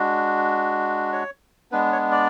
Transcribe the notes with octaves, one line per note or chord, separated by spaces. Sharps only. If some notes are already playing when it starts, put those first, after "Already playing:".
Already playing: G#3 D4 F#4
C#5
G#3 B3 D4 B4
C#5
D5